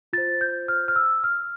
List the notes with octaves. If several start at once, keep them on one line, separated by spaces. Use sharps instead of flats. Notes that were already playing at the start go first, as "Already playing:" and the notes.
F4 C5 A6
G6
F6
F6
E6
F6